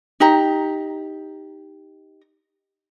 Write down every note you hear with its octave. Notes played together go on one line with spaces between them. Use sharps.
D#4 G4 A#5